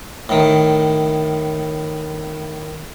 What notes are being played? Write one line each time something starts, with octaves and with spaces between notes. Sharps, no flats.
A2 D#3